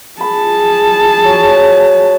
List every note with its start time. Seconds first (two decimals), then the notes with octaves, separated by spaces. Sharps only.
0.21 G#4 A5 B5
1.25 F#3